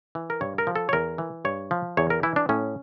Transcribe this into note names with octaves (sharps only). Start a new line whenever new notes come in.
E3
A#4
G2 C#5
A#4
F3
A4
C#5
E2 A#4
E3
G2 C#5
F3
E2 C#5
A#4
E3 E4
D4
A2 C#4